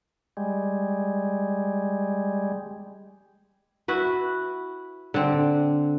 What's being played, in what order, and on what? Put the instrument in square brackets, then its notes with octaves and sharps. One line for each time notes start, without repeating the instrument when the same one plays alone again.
[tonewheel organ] G3 G#3
[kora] E4 F#4 B4
D3 C4